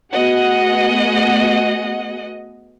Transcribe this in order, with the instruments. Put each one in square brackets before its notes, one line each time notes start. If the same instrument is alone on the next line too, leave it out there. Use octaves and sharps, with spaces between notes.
[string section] A3 B3 F#4 G#4 D#5 F#5